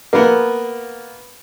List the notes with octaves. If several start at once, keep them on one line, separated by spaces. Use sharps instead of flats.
A#3 B3